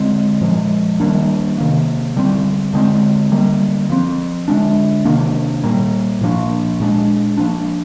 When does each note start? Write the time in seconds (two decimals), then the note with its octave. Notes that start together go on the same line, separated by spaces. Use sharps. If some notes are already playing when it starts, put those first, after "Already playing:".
Already playing: D3 G#3 C4
0.41 A#2 F3 G#3
1.00 D#3 G3 A#3 D4
1.58 C3 D#3 A#3
2.16 D3 G3 C4
2.73 D3 G#3 C4
3.32 D3 G3 A#3
3.90 F3 C4
4.48 D3 G#3 D4
5.05 C3 D#3 A#3 D4
5.64 A#2 G3 A#3
6.21 A#2 F3 A#3 D4
6.80 A#2 G#3 D4
7.37 F3 A#3 D4